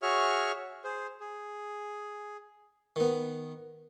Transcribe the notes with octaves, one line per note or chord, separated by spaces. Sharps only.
F#4 G#4 C#5 E5 C#6 F6
G#4 C5
G#4
D#3 B3